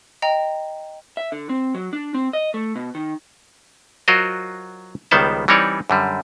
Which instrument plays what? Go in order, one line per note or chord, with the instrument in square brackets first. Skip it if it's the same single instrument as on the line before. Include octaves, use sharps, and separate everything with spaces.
[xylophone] D#5 G5 A#5
[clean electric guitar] E5
D3
C4
F#3
D4
C4
D#5
A3
B2
D#3
[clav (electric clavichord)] F#3 F4 F#4 A#4 C5 D#5
C#2 D#3 G3 B3 C5 A5
E3 G3 C4 D#4 C#5 D5
F#2 D3 G3